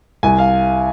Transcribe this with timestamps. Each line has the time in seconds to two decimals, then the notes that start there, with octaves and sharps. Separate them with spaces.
0.23 C2 G#5
0.39 F5